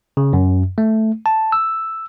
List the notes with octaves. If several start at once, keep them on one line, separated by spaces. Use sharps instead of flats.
C#3
F#2
A3
A5
E6